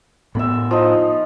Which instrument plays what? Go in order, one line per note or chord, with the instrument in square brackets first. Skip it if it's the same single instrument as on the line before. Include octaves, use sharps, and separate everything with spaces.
[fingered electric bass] A2 B3 [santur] E5 B5
[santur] F3 D#4